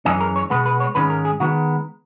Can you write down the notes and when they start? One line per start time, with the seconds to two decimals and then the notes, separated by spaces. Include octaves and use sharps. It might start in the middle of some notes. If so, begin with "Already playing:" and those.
0.05 F#2 E3 G#3 C#4 G#4
0.20 A#4
0.36 C#5
0.50 B2 G#3 B3 B4
0.66 B4
0.80 C#5
0.95 G#2 D#3 G#3 C#4 B4
1.10 A#4
1.25 G#4
1.40 D#3 G#3 B3 F#4